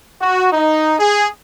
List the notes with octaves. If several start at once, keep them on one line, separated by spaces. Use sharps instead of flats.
F#4
D#4
G#4